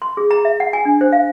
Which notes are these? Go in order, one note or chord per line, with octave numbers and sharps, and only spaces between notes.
C6
G#4
A#5
E5
F#5
G#5
D4
C5
F5